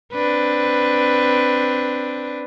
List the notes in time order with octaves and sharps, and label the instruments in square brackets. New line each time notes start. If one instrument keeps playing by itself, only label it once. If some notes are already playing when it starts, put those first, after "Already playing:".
[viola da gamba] C4 D4 B4